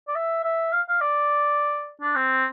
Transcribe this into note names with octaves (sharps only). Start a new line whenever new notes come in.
D5
E5
E5
F5
F5
D5
D4
C4